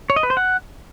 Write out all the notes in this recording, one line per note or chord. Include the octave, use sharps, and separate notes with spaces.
C#5
D#5
B4
C5
F#5